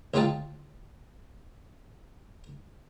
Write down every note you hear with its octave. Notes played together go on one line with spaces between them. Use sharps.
D2 C#3 G#3 F4 G5 A5